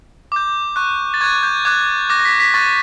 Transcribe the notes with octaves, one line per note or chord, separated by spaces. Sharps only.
D6 G6
C#6 F#6
A6
C#6 F#6 G#6
G6
D6 F#6 G#6
D6 F#6 A#6
A#6
B6
B6
C#6 F#6 A6